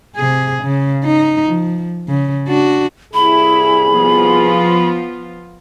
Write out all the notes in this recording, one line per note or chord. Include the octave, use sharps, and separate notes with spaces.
C3 G#4
C#3
D#4
F3
C#3
D4 F#4
C2 E4 G#4 B5
F3 B3 F4